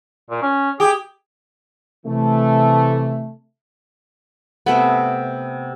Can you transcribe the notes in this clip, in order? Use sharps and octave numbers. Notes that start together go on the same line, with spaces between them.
A#2
C#4
G4 G#4
C3 E3 A3
C3 A3 B3